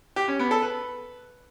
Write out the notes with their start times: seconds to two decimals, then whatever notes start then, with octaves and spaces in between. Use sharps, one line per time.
0.16 G4
0.28 C#4
0.39 B3
0.51 A4
0.62 B4